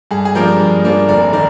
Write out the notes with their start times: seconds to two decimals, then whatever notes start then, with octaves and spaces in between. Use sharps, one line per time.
0.11 G2 G#4
0.25 G#4
0.35 F3 A#3 D4 G4 A#4
0.60 G2
0.84 F3 A#3 D4
1.08 F1 A#4 D5
1.33 D#3 A#4 D5